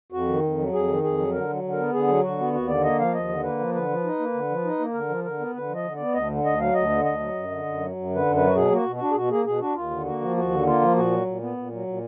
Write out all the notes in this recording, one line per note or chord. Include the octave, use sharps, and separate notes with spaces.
F2 F#4
D#3
F2
F#3
F2 G#4
D#3
F2 G#4
F#3
D3 A#4
F#3
D3
A#4
B3
D3 G#4
F#3
D3 F#4
B3
D#2 F#4
D3 D5
A#3 D#5
F3 F5
D#2 D#5
D3
A#3 B4
F3
D3 B4
F3
D#4
A#3
D3
F3
D#4
A#3
D3 A#4
F3
D3 A#4
B3
D3 B4
F3
D#5
D3
B3 D5
D2 D#5
D3
D2 D#5
F#3 F5
D2 D#5
D3
D2 D#5
F#3
F#2
D3
F#2
F#3
F#2
D3
B4
F#2
F#3 B4
F#4
B2 G#4
A#3
F#4
B2
F#4
D4
G#4
B2 F#4
A#3 G#4
B2 G#4
D4 F#4
D#2 F4
D3
A#3 F#4
F3
D#2 F#4
D3
A#3 F4
F3
A#2 F#4
F#3
A#2
B3
A#2
F#3
A#2